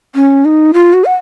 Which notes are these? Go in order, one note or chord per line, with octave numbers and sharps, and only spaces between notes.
C#4
D#4
F4
F#4
F#5